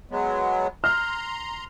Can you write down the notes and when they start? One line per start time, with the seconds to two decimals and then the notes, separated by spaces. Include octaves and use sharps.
0.11 F#3 G#3 B3
0.84 A#5 C6 F6